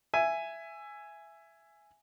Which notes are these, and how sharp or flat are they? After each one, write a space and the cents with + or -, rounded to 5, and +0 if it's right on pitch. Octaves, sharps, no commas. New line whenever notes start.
E5 +15 G#5 +0